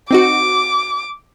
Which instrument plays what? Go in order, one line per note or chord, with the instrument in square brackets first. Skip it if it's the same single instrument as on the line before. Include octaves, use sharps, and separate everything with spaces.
[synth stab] C4 D#4 F#4 [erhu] D6